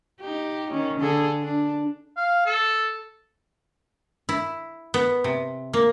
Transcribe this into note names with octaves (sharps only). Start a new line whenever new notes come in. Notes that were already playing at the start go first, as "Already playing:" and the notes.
D#4 G4
D#3 C#4
D3 G#4 A4
D4
F5
A4
E4
B3
C3
A#3